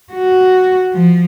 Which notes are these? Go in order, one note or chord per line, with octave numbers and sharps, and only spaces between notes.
F#4
F3